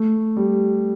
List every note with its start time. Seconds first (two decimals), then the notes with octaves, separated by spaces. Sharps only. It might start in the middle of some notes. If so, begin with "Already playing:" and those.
Already playing: A3
0.37 G3